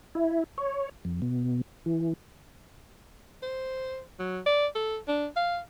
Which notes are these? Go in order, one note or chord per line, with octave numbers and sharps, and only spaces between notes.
E4
C#5
F2
B2
E3
C5
F#3
D5
A4
D4
F5